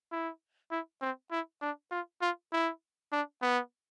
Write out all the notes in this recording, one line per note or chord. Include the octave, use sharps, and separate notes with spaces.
E4
E4
C4
E4
D4
F4
F4
E4
D4
B3